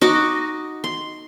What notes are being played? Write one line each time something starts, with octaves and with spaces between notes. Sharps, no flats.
D#4 F#4 D#5 D6
C6